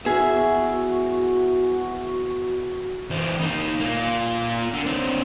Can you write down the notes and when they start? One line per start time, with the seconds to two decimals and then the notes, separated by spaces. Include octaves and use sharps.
0.05 E2 F#4 G#4 E5
3.11 E3 C4
3.41 A#3 D#4
3.80 A#3 F4
4.73 D3
4.86 C4 D4